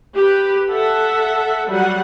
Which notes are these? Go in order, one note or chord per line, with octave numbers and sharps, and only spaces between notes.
G4 B4
A4 E5 F#5
F#3 G3 F#5